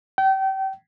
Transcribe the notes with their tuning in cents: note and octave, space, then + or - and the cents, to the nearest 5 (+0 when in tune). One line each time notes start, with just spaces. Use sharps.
G5 -30